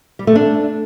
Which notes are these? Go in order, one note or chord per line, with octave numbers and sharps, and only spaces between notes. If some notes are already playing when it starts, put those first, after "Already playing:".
G3
A3
D4